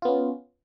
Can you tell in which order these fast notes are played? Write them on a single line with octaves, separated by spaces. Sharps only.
F4 B3 C#4